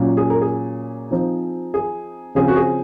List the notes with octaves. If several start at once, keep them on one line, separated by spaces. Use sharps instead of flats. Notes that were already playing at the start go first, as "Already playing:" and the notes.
Already playing: A#2 F#3 C#4
G#4
A#4
G#4
F3 C4 D#4
G#4
C#3 F3 C4 G#4
F#4
G#4